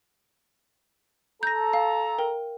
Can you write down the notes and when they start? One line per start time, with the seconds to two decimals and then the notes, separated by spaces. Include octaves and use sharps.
1.43 A4 A#5 G6 A#6
1.73 F5
2.19 A#4 G5